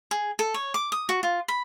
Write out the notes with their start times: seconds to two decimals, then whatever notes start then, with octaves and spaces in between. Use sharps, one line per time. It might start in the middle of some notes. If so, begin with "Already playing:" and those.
0.11 G#4
0.39 A4
0.54 C#5
0.74 D6
0.92 D#6
1.09 F#4
1.23 F4
1.48 B5